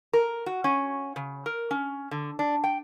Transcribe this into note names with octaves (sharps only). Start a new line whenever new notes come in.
A#4
F#4
C#4
C#3
A#4
C#4
D3
D4
G5